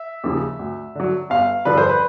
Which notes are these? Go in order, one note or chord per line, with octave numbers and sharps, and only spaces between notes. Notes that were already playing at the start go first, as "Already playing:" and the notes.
Already playing: E5
D#2 C#3 F3
D2
D3 F#3
G1 F5
G2 D3 F3 B4
C5
B4